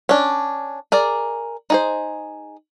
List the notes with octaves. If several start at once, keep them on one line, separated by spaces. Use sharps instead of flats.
C#4 D4
G#4 A#4 D5
D#4 G#4 C5